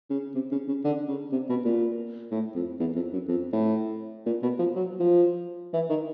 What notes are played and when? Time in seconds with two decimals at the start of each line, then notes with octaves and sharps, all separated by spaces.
0.10 C#3
0.35 C3
0.52 C#3
0.68 C#3
0.84 D3
1.08 C#3
1.32 C3
1.49 B2
1.65 A#2
2.31 A2
2.55 F2
2.80 E2
2.95 F2
3.13 F#2
3.28 F2
3.53 A2
4.26 A#2
4.42 B2
4.59 F3
4.75 F#3
5.00 F3
5.74 E3
5.89 D#3